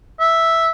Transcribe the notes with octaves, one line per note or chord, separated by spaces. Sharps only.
E5